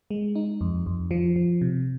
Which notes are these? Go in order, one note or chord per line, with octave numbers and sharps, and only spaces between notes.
G#3
D#4
F2
F2
F3
F3
C3